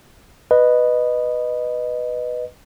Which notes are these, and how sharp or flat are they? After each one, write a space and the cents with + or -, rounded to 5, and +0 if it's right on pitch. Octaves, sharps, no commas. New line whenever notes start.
B4 +0 D#5 -15